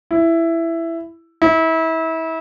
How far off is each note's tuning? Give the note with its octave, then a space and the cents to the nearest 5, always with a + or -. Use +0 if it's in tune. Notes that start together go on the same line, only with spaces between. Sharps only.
E4 +10
E4 -30